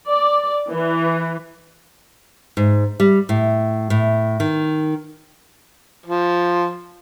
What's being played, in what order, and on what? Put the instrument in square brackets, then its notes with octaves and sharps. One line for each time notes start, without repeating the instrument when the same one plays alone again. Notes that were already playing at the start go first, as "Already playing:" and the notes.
[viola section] D5
E3
[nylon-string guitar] G#2
G3
A2
A2
D#3
[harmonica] F3